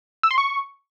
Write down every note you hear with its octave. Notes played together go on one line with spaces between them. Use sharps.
E6
C6
C#6